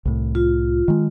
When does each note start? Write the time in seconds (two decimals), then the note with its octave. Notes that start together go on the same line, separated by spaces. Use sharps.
0.05 C2 A2
0.35 F4
0.88 D#3 G#3